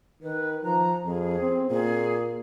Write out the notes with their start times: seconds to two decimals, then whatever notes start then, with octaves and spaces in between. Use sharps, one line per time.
0.23 D#3 B4
0.64 F3 A#5
1.05 F2 G#4
1.39 C4
1.71 A#2 G#4